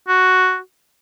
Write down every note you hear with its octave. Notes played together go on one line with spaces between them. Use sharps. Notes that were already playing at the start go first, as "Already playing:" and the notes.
F#4